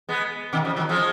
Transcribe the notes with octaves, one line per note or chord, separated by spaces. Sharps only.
G#3 B3
B2 D#3
C#3 F3
D#3 F#3
F3 G#3